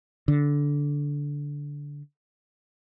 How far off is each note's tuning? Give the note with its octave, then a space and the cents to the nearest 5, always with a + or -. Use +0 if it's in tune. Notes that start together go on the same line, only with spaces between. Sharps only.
D3 -15